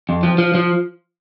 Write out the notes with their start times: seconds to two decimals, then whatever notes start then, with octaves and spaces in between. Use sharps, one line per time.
0.09 F2
0.23 F3
0.38 F3
0.54 F3